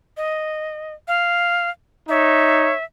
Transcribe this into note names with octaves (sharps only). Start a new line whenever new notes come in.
D#5
F5
D#4 C#5 E5